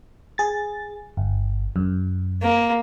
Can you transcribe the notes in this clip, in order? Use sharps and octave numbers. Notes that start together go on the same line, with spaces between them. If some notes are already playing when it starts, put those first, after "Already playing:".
G#4 A6
G1
F#2
A#3